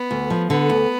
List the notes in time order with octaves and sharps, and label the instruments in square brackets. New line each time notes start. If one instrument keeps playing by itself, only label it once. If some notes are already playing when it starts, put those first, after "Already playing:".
Already playing: [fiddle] B3
[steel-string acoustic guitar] D2
F3
[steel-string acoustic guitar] D3 [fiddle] B3
[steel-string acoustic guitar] D2